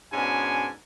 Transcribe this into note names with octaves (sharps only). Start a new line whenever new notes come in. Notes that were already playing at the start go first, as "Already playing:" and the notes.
G#2 B2 C#4 D4 G#5